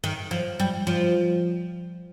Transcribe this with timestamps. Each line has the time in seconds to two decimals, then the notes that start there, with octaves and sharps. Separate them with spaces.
0.04 D#3
0.31 F3
0.60 G3
0.87 F3